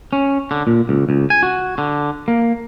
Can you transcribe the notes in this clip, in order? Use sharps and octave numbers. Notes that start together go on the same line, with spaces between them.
C#4
D3
A#2
C#2
C#2
G#5
F#4
D3
A#3